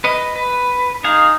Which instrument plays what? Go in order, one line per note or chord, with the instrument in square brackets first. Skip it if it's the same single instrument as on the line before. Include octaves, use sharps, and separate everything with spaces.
[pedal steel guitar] B4 D#5
B4
[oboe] D#4 [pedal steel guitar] G#4 F5